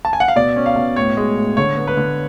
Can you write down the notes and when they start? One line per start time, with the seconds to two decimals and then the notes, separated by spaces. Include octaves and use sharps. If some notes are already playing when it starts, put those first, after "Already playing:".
0.05 A5
0.13 G#5
0.20 F#5
0.28 F5
0.36 B2 D5
0.56 C#4
0.66 F5
0.76 B2
0.96 A2 C#5
1.17 G#3
1.37 A2
1.57 D3 C#5
1.77 B3
1.87 B4
1.97 D3